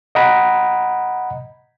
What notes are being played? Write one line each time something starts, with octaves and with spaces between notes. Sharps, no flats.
D#5 F#5 A#5 B5